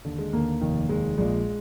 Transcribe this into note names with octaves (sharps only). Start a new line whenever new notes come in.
D#2 D3
G#3
D#2 D3 A#3
F1 D#2 D#3
F1 D#2 D#3 G#3
A#1 A#2 G#3